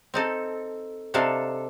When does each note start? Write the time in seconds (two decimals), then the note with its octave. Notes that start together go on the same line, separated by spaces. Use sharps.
0.14 C4 D#4 A4
1.14 C3 D4 D#4 A4 F5